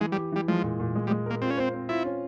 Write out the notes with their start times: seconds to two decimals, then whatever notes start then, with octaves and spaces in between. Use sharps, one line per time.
0.01 E3 G#3
0.12 G3
0.16 G4
0.32 E3 G3
0.48 F3 G#3
0.63 A#2
0.80 A#2
0.95 G#3
1.07 G3
1.11 G#3
1.26 A#3 A#4
1.42 C4 F4
1.50 C#4
1.57 C4 C5
1.74 C4
1.89 E4 F4
2.05 C#4